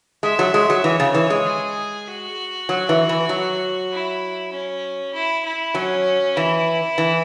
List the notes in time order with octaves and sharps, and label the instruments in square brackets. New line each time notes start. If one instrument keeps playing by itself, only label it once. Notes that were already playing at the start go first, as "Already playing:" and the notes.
[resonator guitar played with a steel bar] G#3 [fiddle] E5
[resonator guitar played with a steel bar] F#3
G#3
F#3
[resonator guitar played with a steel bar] E3 [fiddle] C#5
[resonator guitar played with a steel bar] C#3
E3
G#3
[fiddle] G#4
F#4
[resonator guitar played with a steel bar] F#3
E3
E3
F#3
[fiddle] E4
C#4
E4
E4
[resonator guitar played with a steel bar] F#3 [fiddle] C#4
[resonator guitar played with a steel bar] E3 [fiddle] E4
[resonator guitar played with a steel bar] E3